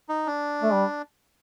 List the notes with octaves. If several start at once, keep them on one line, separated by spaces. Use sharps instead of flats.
D#4
D4
A3
G3